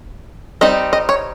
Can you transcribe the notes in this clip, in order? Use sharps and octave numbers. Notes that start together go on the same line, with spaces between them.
G3 C4 D#4 D#5
D#5
C#5